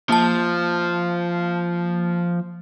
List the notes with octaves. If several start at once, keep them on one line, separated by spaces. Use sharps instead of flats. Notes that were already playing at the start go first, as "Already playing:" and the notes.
F3 A#3 A5